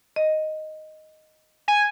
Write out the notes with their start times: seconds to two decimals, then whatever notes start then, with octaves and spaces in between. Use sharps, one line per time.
0.16 D#5
1.68 G#5